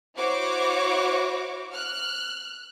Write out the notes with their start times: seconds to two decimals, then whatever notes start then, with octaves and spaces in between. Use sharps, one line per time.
0.16 E4 F#4 C5 C#5 D6
1.72 F6 F#6